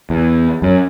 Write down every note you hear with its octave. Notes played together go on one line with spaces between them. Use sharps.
E2
F#2